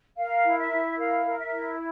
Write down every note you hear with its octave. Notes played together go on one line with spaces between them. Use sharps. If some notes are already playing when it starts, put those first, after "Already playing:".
A#4 F5
E4
E5
E4
A#4 F5
A#4
E5
E4